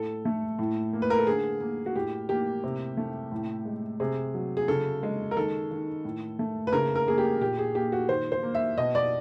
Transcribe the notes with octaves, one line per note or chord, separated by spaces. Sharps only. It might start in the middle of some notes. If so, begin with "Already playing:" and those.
Already playing: A2 A4
A3
A2
A#3
B4
A#4
A4
D3 G#4
A#3
F#4
A2 G4
A#3 G4
C3
A3
A2
G#3
C3 G#4
F#3
G#4
C#3 A4
G#3
A#4
D#3 A4
D#3
A2
A3
B4
C#3 A#4
A#4
A#3 G#4
G4
A#2 G4
G#4
A#3 G4
F#4
D#3 C5
C5
A#3
E5
B2 D#5
D5